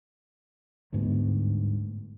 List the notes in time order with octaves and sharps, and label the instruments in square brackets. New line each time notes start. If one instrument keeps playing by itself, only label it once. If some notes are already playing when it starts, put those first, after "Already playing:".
[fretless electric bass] G1 D2 G#2 B3